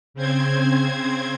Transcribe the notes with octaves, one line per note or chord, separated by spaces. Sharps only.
C#3 C4 C5 G#6